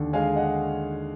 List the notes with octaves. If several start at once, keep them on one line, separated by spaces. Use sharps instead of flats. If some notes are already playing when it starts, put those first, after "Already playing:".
Already playing: D#2 D3
G#3 F5 G#5
D#5 F#5